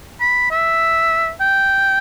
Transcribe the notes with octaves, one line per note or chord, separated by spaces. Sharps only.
B5
E5
G5